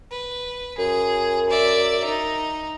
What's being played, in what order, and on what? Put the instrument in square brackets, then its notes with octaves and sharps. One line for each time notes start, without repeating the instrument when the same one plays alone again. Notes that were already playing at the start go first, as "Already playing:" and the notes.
[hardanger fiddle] B4
[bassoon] F#2 [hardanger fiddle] G#4
[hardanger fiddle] D5 E5
D#4